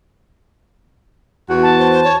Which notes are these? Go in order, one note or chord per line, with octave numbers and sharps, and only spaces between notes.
E2 F#4
A5
C5
C5
C#5